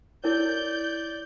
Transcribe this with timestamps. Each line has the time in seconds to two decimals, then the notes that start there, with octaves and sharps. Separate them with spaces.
0.24 E4 A#4 C#5 D5 G6